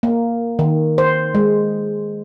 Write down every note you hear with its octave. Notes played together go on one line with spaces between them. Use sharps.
A#3
D#3
C5
G#3